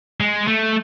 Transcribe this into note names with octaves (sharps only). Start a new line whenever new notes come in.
G#3
A3